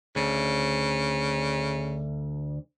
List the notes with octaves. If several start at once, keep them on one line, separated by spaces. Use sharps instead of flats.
D2 C#3